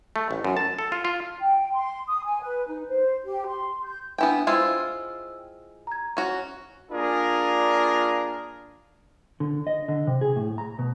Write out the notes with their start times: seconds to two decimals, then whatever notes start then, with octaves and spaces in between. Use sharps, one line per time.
0.16 A3
0.31 A1
0.44 F#2
0.57 A5
0.79 A4
0.92 F4
1.05 F4
1.40 G5
1.73 C6
2.06 D#6
2.24 G#5
2.42 B4
2.66 D#4
2.88 C5
3.24 G4
3.46 C6
3.83 G6
4.18 B3 D4 E4 B4 G5 G#5
4.47 G#3 E4 F4 C5 G5 E6
5.87 A#5 G#6
6.17 C#4 F#4
6.91 A#3 D4 F4 G#4 A#4
9.40 D3
9.67 D#5
9.88 D3
10.07 C3
10.21 G#4
10.36 A2
10.58 A#5
10.79 B2